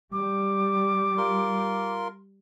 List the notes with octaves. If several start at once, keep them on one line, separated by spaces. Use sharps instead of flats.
G3 D6
F4 A#4 C6